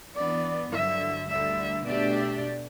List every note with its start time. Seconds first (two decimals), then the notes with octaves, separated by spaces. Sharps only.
0.16 E3 B3 D4 D5
0.72 G2 D3 F#3 E5
1.29 D2 D3 G3 E5
1.86 B2 A3 D4 G4 D5 E5